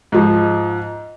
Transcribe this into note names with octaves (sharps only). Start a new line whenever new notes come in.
G#2 F3